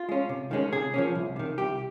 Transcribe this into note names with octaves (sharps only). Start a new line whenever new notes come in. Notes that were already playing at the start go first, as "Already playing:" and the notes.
Already playing: F4
G#3 C#4
C3
D#3 G#3 C#4
C3 G#4
F3 A#3 C#4
C2
C3 D#3
C2 G4